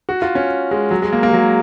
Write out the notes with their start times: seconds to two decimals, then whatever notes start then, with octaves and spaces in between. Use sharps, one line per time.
0.09 F#4
0.22 F4
0.35 C#4
0.71 G#3
0.91 F#3
1.02 G#3
1.12 A#3
1.23 A#3
1.29 G#3
1.33 F#3